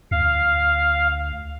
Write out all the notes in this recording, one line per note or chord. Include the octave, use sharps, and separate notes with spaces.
D2 F5